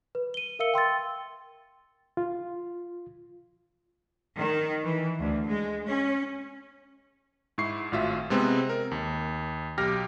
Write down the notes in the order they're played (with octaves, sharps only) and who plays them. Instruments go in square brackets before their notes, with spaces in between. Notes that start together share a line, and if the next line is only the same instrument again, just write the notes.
[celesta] B4
D#7 G7
A#4 E5 F5 E6 C#7 G7
G5 C6 E6 A6
[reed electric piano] F4
[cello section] D#3
E3
D2
G#3
C#4
[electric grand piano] G#2 E4 C#6 C7
G#1 A2 F4 F#4 E5
C3 G#3 B3 C4
A#4
D#2
B1 G4 F6 A#6